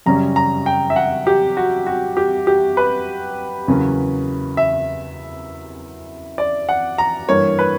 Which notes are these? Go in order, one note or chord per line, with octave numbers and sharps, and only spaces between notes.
F#2 C#3 G3 C#4 A#5
A#5
G5
E5
F#5
G4
F#4
F#4
G4
G4
B4
E2 C#3 F#3 A#3 C#4
E5
D5
F#5
A#5
G2 E3 A#3 C#5
B4